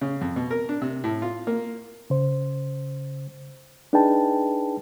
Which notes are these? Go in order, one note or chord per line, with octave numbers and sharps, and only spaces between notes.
C#3
F2
B2
A#4
D4
C3
A2
F4
A#3
C#3 C5
D4 D#4 G#4 B4 G5 A5